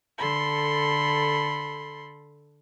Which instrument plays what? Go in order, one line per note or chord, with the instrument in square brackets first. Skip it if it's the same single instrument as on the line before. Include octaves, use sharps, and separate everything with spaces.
[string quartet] D3 A4 B5 C6